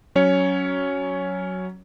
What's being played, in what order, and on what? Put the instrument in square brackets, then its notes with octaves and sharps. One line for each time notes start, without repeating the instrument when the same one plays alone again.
[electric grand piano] F#3 C#4 C#5